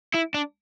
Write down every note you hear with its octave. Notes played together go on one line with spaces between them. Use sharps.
E4
D4